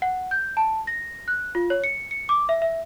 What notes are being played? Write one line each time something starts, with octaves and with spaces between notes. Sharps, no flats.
F#5
G6
A5
A#6
F#6
F4
C#5
C#7
C#7
D6
E5
E5